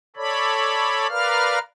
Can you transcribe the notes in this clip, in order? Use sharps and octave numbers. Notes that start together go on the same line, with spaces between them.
A4 C#5 D5 B5
A#4 B4 D5 F5 F6